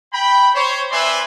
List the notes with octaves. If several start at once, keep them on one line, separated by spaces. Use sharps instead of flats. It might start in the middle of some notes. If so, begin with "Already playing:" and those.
G5 B5
C5 C#5
C4 B4 D5 E5 G#5 C6